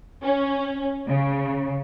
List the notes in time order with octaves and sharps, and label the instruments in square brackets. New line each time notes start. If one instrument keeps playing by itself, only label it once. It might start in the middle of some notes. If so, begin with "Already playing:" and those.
[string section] C#4
C#3